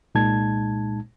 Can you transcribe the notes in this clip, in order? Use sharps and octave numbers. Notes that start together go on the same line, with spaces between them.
C2 A#2 G#3 D#4 A5 G#6